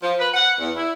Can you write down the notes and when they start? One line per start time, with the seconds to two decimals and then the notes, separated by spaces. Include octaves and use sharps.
0.03 F3
0.19 B4
0.34 F#5
0.60 E2
0.75 E4